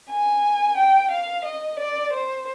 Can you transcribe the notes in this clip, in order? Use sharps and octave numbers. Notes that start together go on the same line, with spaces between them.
G#5
G5
F5
D#5
D5
C5